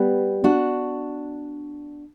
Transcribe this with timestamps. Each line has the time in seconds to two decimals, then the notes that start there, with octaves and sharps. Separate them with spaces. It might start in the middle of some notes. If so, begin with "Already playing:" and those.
Already playing: G3 B3
0.44 D4 F#4